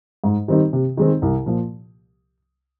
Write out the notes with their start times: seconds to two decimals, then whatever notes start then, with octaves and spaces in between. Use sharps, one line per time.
0.24 G#2
0.48 D#3 G3 C4 D#4
0.73 C3
0.97 D#3 G#3 C4
1.22 C2
1.46 A#2 F3